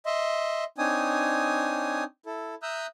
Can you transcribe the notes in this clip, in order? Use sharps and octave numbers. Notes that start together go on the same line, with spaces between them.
D#5 E5 C6
C4 D4 D#4 C#5 G#5 D#6
E4 A4
E5 A#5 D#6 E6 F#6 G6